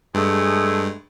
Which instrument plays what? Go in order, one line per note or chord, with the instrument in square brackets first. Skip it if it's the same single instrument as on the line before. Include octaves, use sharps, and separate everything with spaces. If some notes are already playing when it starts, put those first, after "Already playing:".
[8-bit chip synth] G2 [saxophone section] G#3 A3 G#4